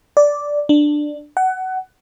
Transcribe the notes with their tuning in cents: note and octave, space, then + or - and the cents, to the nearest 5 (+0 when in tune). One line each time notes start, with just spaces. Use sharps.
D5 -5
D4 +10
F#5 +20